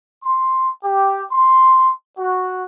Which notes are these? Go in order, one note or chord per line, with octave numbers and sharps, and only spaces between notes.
C6
G4
C6
F#4